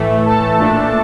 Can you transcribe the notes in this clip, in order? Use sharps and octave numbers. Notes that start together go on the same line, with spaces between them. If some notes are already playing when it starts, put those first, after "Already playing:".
Already playing: A2 E3 A3
A4 A5
A#2 A3 D4